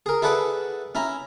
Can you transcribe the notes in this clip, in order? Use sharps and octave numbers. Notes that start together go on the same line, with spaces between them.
G#4 A#4
E4 G#4 A4 B4 D5 F#5
C#4 E4 A#5